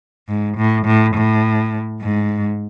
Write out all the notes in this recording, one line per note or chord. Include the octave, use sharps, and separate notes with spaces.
G#2
A2
A2
A2
G#2